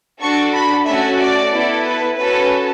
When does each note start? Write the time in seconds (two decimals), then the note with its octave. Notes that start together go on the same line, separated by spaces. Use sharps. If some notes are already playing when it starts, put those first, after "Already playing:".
0.21 D4 F#4 A4 C#6
0.54 B5
0.86 A3 C#4 F#4 A4 E5
1.18 D5
1.51 B3 E4 A4
1.85 B4
2.17 C#4 F#4 A4 B4